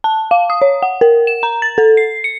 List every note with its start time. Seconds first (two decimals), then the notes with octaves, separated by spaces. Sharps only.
0.04 A5
0.31 F5
0.50 D#6
0.62 C#5
0.83 F#5
1.01 A#4
1.27 E7
1.43 A#5
1.62 A6
1.78 A4
1.97 C7
2.24 C#7